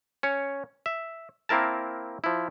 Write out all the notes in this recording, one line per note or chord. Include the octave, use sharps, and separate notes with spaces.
C#4 C#5
E5
A#3 C4 E4 A#4 A5
F3 E4